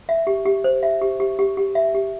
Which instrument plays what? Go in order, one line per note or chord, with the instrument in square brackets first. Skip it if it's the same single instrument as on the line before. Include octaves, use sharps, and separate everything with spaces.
[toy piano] E5
G4
G4
C5
E5
G4
G4
G4
G4
E5
G4